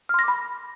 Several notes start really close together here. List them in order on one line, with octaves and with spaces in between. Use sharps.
F6 C6 A#6 D6 B5